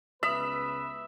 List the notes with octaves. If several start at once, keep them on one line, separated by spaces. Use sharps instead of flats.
C#2 B3 B4 E5 D#6 F#7